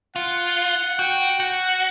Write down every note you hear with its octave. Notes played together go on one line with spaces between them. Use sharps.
F4 F#5
F#4 G5
F#4 F#5